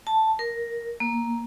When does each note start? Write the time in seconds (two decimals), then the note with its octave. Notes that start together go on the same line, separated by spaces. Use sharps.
0.07 A5
0.39 A#4
1.00 A#3